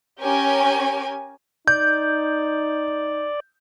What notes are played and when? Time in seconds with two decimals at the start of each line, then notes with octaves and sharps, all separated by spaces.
0.20 C#4 G4 A#4 G#5
1.68 D#4 D5 G6